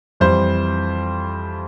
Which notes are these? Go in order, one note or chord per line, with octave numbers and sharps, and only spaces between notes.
F2 E3 G3 C5